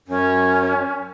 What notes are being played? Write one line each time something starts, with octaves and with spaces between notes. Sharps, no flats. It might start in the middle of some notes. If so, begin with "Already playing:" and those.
F#2 C#4